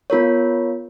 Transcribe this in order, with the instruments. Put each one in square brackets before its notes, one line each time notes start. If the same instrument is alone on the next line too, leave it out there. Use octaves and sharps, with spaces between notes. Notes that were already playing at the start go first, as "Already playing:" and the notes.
[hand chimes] B3 F4 A#4 C#5